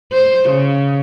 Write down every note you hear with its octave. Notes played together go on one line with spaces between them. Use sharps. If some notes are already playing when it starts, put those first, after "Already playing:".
C5
C#3